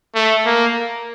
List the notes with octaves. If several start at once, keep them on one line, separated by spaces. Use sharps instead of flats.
A3
A#3